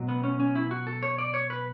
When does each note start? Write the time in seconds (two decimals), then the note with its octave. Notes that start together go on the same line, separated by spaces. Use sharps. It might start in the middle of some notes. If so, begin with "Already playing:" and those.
Already playing: B2 F#3
0.09 B3
0.24 C#4
0.40 C#4
0.55 E4
0.71 F#4
0.87 A4
1.03 C#5
1.18 D5
1.34 C#5
1.50 B4